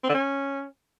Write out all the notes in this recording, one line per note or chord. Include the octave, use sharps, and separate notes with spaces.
C4
D3
C#4